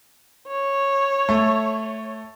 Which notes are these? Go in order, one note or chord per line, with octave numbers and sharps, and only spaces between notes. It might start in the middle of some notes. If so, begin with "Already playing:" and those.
C#5
A3